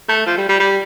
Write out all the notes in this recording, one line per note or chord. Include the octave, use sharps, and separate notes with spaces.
A3
F3
G3
G3
G3